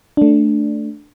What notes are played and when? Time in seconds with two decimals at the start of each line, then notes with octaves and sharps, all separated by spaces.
0.17 A3 D4